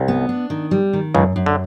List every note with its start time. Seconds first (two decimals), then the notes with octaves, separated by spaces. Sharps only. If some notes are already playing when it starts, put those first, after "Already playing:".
Already playing: C2
0.08 B3
0.29 D4
0.50 D#3
0.71 G3
0.93 D#3
1.15 C#2 F#2 C#3
1.36 F#2
1.46 D3